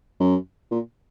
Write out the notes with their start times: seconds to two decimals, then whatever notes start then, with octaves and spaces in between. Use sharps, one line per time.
0.20 F#2
0.71 A#2